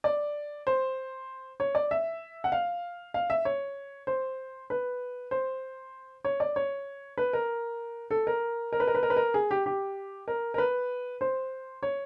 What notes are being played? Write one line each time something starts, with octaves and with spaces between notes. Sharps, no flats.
D5
C5
C#5
D5
E5
F#5
F5
F5
E5
C#5
C5
B4
C5
C#5
D5
C#5
B4
A#4
A4
A#4
A#4
B4
A#4
B4
A#4
B4
A#4
G#4
G4
G4
A#4
A#4
B4
C5
C#5